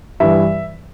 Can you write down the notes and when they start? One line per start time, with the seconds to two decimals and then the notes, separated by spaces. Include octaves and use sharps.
0.20 G2 E3 E5